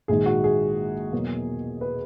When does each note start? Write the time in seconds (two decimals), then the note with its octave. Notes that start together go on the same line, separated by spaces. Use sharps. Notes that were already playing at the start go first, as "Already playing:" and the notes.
0.08 A#1 G#2 D#3 G#4
0.26 F#4
0.44 G#4
1.12 E2 B2 F#3 A#3
1.81 B4